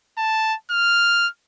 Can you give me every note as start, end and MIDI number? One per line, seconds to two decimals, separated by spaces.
0.18 0.54 81
0.71 1.28 89